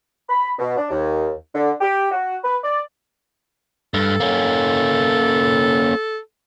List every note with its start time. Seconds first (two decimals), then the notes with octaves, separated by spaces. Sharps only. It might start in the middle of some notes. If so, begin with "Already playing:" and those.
0.29 B5
0.58 B2
0.77 D4
0.91 D#2
1.54 D3
1.80 G4
2.12 F#4
2.43 B4
2.64 D5
3.94 G2 A4
4.20 A#3 C#4